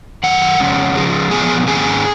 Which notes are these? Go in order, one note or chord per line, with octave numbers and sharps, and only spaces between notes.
F#2 D#3 F#5
F2 C#3 G#3 C#4
C#3 F3 G#3
A#2 F3 B3 G#4 G#5
G#2 D#3 A#3 C#4 G#4 G#5